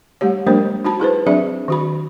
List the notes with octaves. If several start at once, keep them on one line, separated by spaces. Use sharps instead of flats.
G3 A3 G4 C#5
F#3 G#3 A#3 D4 A#4 C5
D#4 F#4 A5 B5
E4 G#4 B4 C5
F#3 C4 D4 G#4 D5 E5
D#3 F#4 B5